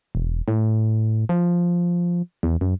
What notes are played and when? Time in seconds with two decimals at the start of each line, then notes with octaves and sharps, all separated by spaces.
0.15 E1
0.48 A2
1.29 F3
2.43 E2
2.61 F#2